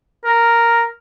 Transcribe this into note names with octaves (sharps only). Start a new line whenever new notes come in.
A#4